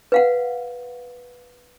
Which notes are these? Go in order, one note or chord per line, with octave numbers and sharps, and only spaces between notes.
B4 F5 F#5